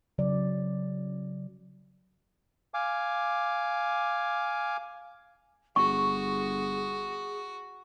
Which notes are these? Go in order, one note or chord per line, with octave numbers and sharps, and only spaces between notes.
C#3 F#3 D5
F5 G#5 D6
G1 F#4 G#4 C#6